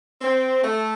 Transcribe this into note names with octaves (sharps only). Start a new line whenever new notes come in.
C4
A3